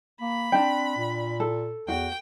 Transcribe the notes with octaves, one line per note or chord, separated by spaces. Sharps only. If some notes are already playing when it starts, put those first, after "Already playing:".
A#3 B5
C4 D4 G5
A#2
A4
E2 F#4 G5